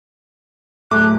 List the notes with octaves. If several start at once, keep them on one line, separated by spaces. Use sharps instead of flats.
D1 A3 D6 F#6